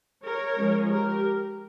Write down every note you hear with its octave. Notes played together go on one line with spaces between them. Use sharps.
A#4 C#5
F3 G#3 C#4
G4 A#4